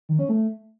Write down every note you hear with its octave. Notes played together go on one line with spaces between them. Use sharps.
D#3
C#4
A3